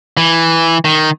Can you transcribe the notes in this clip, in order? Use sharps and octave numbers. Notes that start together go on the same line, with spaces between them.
E3
D#3